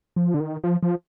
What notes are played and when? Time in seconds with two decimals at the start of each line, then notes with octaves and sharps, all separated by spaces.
0.16 F3
0.34 D3
0.40 D#3
0.64 F3
0.83 F3